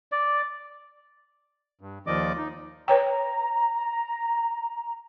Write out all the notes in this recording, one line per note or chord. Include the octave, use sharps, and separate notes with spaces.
D5
G2
D#2 D#3 F3 D5 D#5 D6
D#4
B4 C#5 G5 A#5